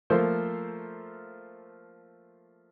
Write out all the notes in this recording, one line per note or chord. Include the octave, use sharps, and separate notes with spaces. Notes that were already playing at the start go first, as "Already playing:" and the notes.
F3 A3 A#3 A#4 C5